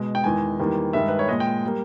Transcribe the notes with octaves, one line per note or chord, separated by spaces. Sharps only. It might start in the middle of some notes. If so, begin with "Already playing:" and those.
Already playing: B2 G#3
G5
E2 D#3 G#3 G#5
E2 D#3 G3 A#3
G2 D#3 G#3 E5
B4
C#5
A#2 G#3 D#5
G5
G3 A#3